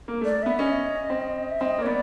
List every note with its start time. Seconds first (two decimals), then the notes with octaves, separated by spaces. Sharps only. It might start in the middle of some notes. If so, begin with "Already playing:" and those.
0.08 A#3
0.21 A3 D5
0.43 B3 E5
0.59 C#4 D#5
1.10 C4
1.50 E5
1.60 C4 D#5
1.78 A#3
1.82 C#5
1.86 B3 D5